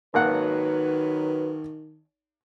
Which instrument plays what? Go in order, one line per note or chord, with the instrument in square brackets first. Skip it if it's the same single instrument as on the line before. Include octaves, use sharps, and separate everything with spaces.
[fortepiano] G#1 A#3 F#5 [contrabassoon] D#3 [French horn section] F#3 B4